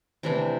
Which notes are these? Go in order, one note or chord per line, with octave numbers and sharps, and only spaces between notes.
C3 E3 A3 D4